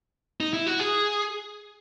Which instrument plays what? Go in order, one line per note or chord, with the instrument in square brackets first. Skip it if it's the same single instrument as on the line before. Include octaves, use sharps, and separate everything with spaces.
[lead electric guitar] D#4
E4
F#4
G#4